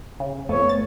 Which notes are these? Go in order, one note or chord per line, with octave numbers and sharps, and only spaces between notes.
C#3
F2 A3 B3 C#5
A6